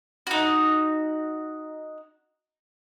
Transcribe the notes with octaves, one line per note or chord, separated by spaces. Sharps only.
D#4 F#4